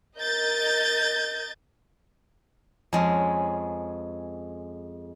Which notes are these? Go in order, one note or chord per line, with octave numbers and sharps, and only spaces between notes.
A#4 D#5 G6 A6
F2 G#3 C#4